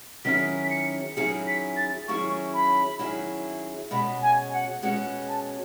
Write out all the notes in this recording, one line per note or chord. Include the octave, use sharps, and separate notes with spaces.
D#3 F#3 C#4 E4 G#4 B6
B6
C#7
D#3 F#3 C#4 E4 G#4 C#7
B6
A6
D#3 F#3 C#4 E4 G#4 C#6
B5
D#3 F#3 C#4 E4 G#4
B2 G#3 C#4 F#4 B5
G#5
F#5
B2 G#3 C#4 F#4 F#5
A5